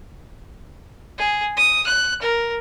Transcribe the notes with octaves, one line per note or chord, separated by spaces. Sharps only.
G#4
D#6
F#6
A#4